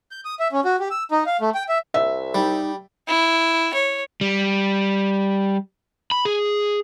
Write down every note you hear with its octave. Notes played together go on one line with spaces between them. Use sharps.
G6
D#6
E5
C#4
F#4
G4
E6
D#4
F5
A3
G5
E5
C2 E5
G3 D#4
E4
C#5
G3
B5
G#4